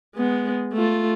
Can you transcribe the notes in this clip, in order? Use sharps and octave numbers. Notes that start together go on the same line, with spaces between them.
G#3 B3
A3 F4